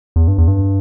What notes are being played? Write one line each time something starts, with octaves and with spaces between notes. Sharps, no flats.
E2
G2
E2
G2